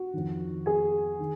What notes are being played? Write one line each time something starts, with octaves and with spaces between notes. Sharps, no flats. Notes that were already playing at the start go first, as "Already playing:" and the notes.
Already playing: F#4
F2 D#3
G#4 G#5
D#3